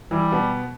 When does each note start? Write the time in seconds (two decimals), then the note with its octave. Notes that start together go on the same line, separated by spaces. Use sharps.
0.11 E3 G3
0.32 B2 B3